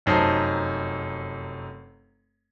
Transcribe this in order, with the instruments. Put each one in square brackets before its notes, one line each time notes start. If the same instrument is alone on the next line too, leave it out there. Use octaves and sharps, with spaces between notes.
[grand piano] F1 F#2 D#4 C5 A5